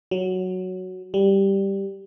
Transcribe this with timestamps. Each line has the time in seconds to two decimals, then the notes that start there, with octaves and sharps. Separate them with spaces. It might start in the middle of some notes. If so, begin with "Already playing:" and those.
0.11 F#3
1.14 G3